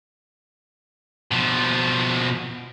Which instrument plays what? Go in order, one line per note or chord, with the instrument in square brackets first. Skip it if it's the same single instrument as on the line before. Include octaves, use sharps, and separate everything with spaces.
[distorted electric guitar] B2 F3